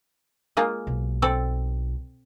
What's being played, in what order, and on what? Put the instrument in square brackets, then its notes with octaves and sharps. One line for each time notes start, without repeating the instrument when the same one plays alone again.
[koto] G#3 A#3 F4
[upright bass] B1
[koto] C4 A4 D5